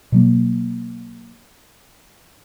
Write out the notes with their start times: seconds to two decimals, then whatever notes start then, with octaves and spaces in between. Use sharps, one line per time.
0.12 B2 F#3 A#3